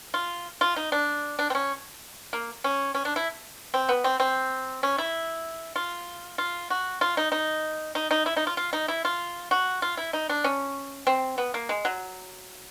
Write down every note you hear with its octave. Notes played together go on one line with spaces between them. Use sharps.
F4
F4
D#4
D4
D4
C4
C#4
A#3
C#4
C#4
D4
E4
C4
B3
C4
C4
C#4
E4
F4
F4
F#4
F4
D#4
D#4
D#4
D#4
E4
D#4
F4
F4
D#4
E4
F4
F#4
F4
E4
D#4
D4
C#4
C4
B3
A#3
G#3
F#3